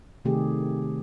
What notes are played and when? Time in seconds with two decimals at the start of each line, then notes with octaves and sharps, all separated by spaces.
0.25 C3 D#3 A3 C4 G4 G#4